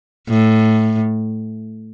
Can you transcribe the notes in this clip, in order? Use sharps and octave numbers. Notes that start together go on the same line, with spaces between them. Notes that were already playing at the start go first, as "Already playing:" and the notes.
A2